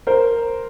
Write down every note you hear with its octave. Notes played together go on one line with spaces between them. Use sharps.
A#4 C5